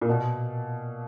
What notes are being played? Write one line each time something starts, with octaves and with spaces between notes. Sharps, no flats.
A#2
B2